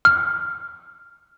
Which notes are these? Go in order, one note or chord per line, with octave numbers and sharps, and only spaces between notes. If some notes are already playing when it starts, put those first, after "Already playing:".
F6